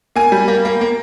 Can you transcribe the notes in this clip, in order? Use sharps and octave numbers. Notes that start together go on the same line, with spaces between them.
A#3 G#5
G3
A#3
A#3
A#3